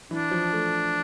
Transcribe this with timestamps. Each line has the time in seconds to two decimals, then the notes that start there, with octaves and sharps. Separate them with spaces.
0.11 E3 D4
0.31 F3
0.53 A3